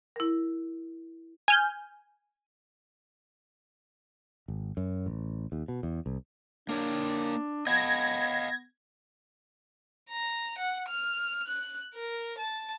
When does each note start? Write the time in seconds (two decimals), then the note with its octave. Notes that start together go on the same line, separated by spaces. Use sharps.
0.16 E4 A#4
1.48 G#5 F6 G6
4.48 G#1
4.77 F#2
5.06 A1
5.52 D#2
5.68 B2
5.83 E2
6.06 C2
6.69 A#3 D4 A#4 C#5
7.67 B3 D#5 F5 A5 G#6 A#6
10.10 A#5
10.58 F#5
10.89 F6
11.48 F#6
11.94 A#4
12.38 A5